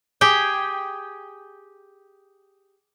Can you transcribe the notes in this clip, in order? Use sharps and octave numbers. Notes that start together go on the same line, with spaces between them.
G4 G#4 G5